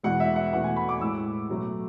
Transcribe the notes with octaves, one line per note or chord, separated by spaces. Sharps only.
E2 B2 G#3 F#5
E5
F#5
E2 B2 A3 F#5
G#5
B5
D6
A2 G#3 E6
B2 F#3 A3